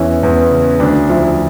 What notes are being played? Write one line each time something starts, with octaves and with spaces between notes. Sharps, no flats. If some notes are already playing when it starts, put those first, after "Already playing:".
Already playing: E2 E3 C#4
E2
C#3
D2 D4
F3 E4